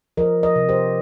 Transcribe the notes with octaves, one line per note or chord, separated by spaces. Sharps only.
F3 A#4 D#5
A#4 D#5
C3
G4 C5